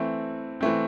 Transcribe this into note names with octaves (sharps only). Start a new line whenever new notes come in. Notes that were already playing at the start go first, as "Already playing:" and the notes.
Already playing: E3 A3 C4
E3 A3 C4